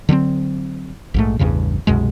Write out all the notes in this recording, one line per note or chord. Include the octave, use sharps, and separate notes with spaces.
D3 F#3 G3 C4
A#1 G#2 A3
A1 E2 G2 C#3
C2 F#2 B2 G#3